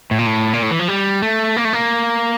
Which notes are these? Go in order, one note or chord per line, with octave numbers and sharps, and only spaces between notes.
A2
A#2
A2
A#2
A2
E3
F3
G3
A3
A#3
A3
A#3